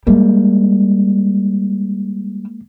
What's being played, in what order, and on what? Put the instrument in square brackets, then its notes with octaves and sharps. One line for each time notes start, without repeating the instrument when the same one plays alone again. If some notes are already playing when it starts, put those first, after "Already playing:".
[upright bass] G3 [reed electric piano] G#3 A#3